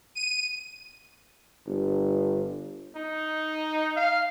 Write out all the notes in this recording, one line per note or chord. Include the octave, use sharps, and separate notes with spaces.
D#7
G1
D#4
F5